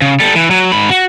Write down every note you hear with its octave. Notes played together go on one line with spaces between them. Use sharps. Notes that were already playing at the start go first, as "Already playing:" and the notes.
C#3
G3 A4
E3
F#3
G#2 B5
F#4